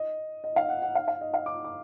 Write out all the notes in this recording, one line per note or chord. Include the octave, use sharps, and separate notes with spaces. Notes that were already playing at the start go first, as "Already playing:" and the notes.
Already playing: D#5
D#5
F5
F#5
F#5
F5
F5
D#5
F5
D6
D6